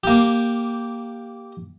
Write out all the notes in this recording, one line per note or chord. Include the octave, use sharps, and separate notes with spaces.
A#3 G4